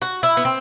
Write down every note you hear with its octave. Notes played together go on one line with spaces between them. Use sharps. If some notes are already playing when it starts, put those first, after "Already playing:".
F#4
E4
B3
C4